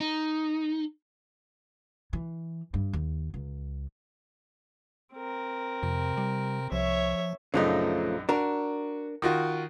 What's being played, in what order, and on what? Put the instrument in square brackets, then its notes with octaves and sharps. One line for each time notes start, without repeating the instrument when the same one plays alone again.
[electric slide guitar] D#4
[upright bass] E3
G2
D#2
C#2
[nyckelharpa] C4 A#4
[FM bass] F2 [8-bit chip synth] C3
[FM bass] G3
[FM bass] C2 [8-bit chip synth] F3 [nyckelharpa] C#5 E5
[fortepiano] A#1 F#2 D#4 [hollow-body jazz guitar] C#3 F3 A3
[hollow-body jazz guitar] D4 A#4 [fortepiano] F#4
[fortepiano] D#3 F4 F#4